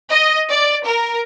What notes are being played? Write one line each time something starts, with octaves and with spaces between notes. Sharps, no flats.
D#5
D5
A#4